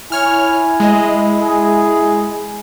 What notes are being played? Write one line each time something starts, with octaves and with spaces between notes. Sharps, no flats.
E4 C#5 G#5 F6
G#3 D#5
G#4